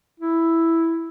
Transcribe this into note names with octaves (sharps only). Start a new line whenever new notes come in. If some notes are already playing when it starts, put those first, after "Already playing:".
E4